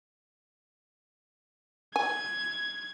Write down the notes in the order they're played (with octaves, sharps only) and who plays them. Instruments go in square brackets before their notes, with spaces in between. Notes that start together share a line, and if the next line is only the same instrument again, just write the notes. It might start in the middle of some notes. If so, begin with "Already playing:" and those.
[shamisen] G#5 [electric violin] G#6